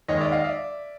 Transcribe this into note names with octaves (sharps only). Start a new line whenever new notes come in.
D#2 D#3 G#3 C#5 D#5
D5 E5
D#5 F5
D5 E5